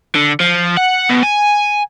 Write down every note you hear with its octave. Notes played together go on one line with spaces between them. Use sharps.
D3
F3
F#5
B2
G#5